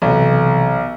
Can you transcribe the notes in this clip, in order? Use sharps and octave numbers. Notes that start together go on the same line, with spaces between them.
B1 C3 E3